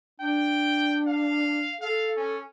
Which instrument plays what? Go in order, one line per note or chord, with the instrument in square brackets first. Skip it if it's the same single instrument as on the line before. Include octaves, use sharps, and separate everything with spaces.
[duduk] D4 [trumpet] G5
[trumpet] F5
[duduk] A4 [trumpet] F5
[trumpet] C#4